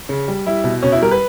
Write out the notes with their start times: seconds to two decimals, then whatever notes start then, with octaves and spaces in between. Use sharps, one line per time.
0.09 C#3
0.28 G3
0.47 G3 E4
0.64 B2
0.82 B2 C#4
0.92 E4
1.02 G3 A#4
1.11 B4